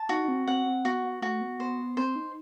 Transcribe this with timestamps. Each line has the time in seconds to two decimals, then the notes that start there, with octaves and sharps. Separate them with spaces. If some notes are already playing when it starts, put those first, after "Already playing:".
Already playing: A5
0.09 D#4 F#4
0.24 D#4
0.28 C4
0.47 C4 F#5
0.66 C4
0.85 B3 F#4
1.03 B3
1.22 A3 F#4
1.41 B3
1.59 B3 C5
1.78 B3
1.97 C4 C5
2.16 D#4